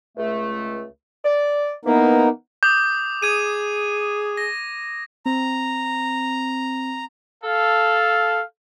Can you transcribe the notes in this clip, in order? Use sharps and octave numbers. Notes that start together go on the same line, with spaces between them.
C#2 A3
D5
E3 A#3 B3 D#4 A#4
D6 D#6 G6
G#4 D#6 G#6 D#7
A#6
C4 A#5
A4 F5